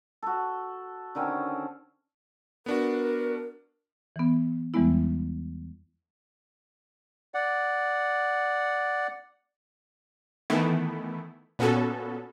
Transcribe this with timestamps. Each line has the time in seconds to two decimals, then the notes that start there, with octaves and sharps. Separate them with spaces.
0.23 F#4 A4
1.15 D3 D#3 C4 C#4
2.66 B3 D4 F#4 A#4
4.16 E3 B3
4.74 E2 E3 G3 G#3 B3 E4
7.34 D5 F#5
10.50 D#3 E3 A3 B3 E4
11.59 A#2 B3 C#4 F#4 A4